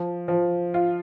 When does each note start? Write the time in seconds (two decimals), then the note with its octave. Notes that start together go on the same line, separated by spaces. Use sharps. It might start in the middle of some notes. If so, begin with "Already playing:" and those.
Already playing: F3
0.28 F3
0.74 F4